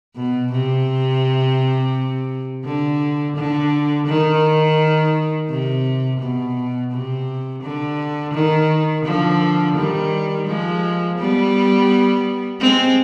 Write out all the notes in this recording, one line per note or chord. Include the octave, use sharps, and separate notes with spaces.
B2
C3
D3
D3
D#3
C3
B2
C3
D3
D#3
D3 F3
D#3 G3
F3 G#3
G3 B3
G#3 C4